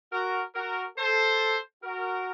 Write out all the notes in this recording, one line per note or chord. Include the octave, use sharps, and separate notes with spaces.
F#4 A#4
F#4 A#4
A4 C5
F#4 A#4